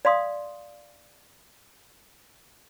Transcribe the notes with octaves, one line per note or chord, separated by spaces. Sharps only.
D5 F5 C6 D#6